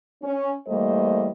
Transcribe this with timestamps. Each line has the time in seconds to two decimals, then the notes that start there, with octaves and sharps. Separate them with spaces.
0.23 C#4
0.67 E2 G3 A3 A#3 C5 D#5